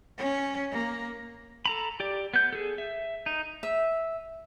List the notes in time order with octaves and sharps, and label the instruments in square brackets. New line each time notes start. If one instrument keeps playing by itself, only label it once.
[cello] C#4
A#3
[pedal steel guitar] A4 A#5 B5
G4 D5
B3 G6
G#4 A4
E5
D#4
[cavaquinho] E5